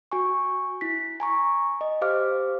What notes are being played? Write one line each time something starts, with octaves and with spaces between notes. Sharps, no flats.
F#4 G#5 C#6
E4 B6
G#5 A#5 C#6
D#5
G4 C5 F5 D6 F6